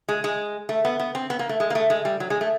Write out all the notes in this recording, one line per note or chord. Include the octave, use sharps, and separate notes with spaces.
G#3
G#3
A3
B3
B3
C4
B3
A#3
A3
G#3
A#3
A3
G#3
G3
F#3
G#3
A3